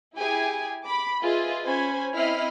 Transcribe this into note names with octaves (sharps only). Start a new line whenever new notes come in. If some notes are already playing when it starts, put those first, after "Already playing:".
E4 G4 G#4 G#5
B5 D6
F4 G#4 B4 D#5 E5
C#4 C5 G#5 B5
C4 E4 D#5 B5 F6 C7